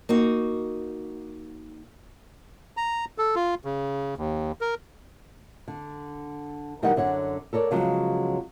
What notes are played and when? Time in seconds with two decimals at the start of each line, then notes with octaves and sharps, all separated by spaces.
0.09 A#3 D#4 F#4
2.77 A#5
3.18 A4
3.36 F4
3.65 C#3
4.17 D#2
4.61 A#4
5.68 D3
6.82 B2 E3 G3 D#4 A#4 F#5
6.96 F#2 D3 C#5 F#5
7.53 A4 A#4 C#5 D5
7.71 C#3 F3 F#3 G#3 B3